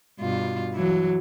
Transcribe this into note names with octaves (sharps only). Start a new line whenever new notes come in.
G2 B2 F4
E3 F#3